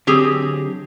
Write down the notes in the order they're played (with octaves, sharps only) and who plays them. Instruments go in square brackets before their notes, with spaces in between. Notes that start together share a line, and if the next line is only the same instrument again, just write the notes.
[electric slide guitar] D3 F#3 [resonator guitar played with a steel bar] C4 G4 G#4